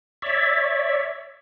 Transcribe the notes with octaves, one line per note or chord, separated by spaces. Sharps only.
C#5 D5 E5